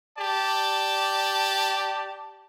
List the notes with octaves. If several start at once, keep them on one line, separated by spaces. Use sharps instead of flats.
G4 D5 A5